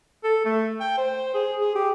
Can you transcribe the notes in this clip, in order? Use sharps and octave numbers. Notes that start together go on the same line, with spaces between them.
A4
A3
G5
C5
G#4
G#4
G4